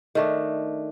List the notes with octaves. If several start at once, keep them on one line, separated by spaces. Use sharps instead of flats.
D#3 A3 D4